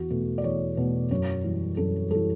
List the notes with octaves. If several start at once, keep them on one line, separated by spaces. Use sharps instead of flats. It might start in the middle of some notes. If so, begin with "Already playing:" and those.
Already playing: E2 F#4
B2 A3
D5
E2 C#5
B2 A3
F#2 C#5
E3 G3
F#2 A4
E3 G3 A4